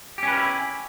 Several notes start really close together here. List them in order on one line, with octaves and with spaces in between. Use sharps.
G4 C#4 B4 A#4 E4